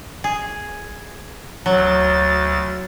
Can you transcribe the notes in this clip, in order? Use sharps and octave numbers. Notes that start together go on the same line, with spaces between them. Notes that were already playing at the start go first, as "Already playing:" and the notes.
G#4
D2 F#3 A6